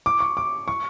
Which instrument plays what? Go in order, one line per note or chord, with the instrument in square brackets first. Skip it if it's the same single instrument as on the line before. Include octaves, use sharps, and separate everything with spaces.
[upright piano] D6
C#6
D6
C#6